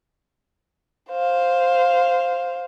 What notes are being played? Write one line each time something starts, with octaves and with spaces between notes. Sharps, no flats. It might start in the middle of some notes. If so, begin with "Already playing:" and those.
C5 F5